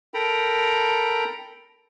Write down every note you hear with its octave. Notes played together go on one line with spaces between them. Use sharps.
A4 A#4 G5 A#5 B5